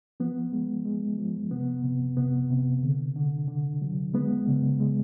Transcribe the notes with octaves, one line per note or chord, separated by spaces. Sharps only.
F3 B3
G#3
G#3
F3
C3 B3
C3
C3 B3
C3
D3
D3
D3
F#3
G#3 B3
C#3
G#3